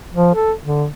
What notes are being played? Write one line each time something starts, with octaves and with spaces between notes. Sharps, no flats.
F3
A4
D3